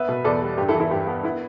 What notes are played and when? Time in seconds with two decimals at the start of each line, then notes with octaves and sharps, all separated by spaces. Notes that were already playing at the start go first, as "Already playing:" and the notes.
Already playing: B3 B4 E5
0.09 B2
0.24 E2 A4 D5
0.42 G3
0.58 G2 G4
0.68 E4 A4
0.75 E3
0.80 E4 A4
0.91 G2 G4
1.07 B3
1.23 B3 E4